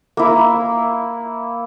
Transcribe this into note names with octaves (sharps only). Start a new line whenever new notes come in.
A#3 E4